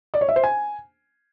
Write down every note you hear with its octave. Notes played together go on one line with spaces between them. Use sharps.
D5
C#5
E5
C5
G#5